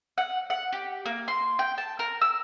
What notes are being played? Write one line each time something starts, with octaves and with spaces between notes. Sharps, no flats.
F#5
F#5
G4
A#3
C6
G5
A5
A#4
E6